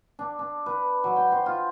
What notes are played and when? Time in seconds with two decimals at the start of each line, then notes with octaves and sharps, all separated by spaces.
0.19 D4
0.39 D4
0.66 B4
1.04 F#3
1.16 G5
1.32 C5
1.46 F4